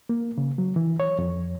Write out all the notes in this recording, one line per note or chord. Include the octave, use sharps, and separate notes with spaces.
A#3
C#3
F#3
E3
C#5
F2